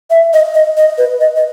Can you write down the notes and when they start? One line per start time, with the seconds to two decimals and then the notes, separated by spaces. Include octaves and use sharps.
0.10 E5
0.33 D#5
0.54 D#5
0.77 D#5
0.98 B4
1.21 D#5
1.36 D#5